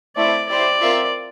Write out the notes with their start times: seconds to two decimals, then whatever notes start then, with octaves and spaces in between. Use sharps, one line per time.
0.16 A3 C4 E4 D5
0.48 E4 G4 C5 D5
0.81 C4 F4 A#4 E5